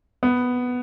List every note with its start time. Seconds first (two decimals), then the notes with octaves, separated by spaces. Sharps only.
0.23 B3